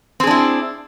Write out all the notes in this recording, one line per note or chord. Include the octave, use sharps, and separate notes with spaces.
C4 D4 E4 G#4